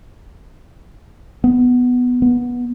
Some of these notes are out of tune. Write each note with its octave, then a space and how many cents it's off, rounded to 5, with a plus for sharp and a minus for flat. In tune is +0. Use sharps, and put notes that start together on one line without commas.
B3 +5
B3 -15